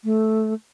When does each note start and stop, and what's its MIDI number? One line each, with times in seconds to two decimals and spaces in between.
0.04 0.54 57